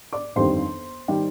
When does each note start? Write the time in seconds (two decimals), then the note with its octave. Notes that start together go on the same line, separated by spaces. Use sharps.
0.13 D5 D6
0.36 G1 F2 D#3 G3 C5 C6
1.08 D#3 G3